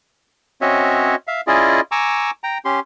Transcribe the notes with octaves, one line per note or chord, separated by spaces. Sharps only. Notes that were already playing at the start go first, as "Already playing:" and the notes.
C4 C#4 F#4 C#5 D#5 E5
E5 F5
C#4 E4 F4 G#4 D5 D#5
G#5 A#5 C#6 D6 E6
G5 A#5
C#4 G4 C6